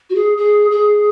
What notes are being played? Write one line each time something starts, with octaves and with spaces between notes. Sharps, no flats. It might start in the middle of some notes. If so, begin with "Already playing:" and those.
F#4
G#4
G#4
G#4